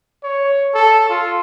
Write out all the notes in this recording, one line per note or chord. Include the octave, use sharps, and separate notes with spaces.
C#5
A4
F4